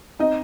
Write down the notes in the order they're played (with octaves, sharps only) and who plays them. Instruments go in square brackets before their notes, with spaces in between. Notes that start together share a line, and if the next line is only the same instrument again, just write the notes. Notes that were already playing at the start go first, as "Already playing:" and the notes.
[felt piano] C4 D#4 D#5